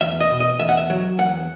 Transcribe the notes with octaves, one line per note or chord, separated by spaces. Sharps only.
E2 E5
D#5
B2
D#5
E2 E5
F#5
E5
F#3
E2 F#5